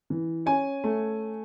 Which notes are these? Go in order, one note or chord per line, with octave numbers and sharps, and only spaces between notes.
E3
C#4 G#5
A3